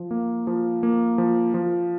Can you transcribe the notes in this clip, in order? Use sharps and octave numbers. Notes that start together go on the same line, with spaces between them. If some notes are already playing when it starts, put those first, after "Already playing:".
Already playing: F3
A#3
F3
A#3
F3
F3